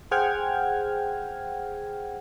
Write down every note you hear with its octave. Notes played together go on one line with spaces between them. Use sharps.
G#4 C5 F#5 G5 F6 G#6